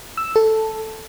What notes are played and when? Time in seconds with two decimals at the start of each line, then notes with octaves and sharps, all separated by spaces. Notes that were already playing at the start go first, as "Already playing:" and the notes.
0.17 E6
0.36 A4